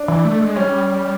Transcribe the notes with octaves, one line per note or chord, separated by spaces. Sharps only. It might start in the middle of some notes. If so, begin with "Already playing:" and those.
Already playing: D4
E3
A3
G#3
G3 C#4